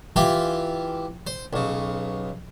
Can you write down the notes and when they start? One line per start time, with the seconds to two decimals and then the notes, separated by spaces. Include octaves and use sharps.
0.16 E3 F4 G4 G5 G#5
1.27 C5
1.53 B1 C#3